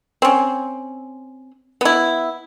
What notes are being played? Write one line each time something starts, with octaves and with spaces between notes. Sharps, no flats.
C4 C#4
B3 E4